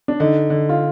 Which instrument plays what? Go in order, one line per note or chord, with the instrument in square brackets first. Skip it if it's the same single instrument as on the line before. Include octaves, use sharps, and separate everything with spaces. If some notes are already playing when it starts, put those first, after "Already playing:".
[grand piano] D4
[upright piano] D3 [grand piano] D#4
[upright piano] D3
[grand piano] F4